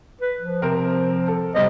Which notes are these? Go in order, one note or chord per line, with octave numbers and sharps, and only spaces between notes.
B4
F3
C3 C4 A#4
A4
C3 G3 C4 D#5